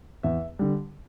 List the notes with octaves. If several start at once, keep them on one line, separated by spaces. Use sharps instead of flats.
E2 E5
D3 G3